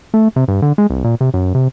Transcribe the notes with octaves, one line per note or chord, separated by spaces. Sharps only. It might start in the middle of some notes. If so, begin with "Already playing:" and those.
A3
C3
G2
D3
G#3
C2
A#2
C3
F#2
C3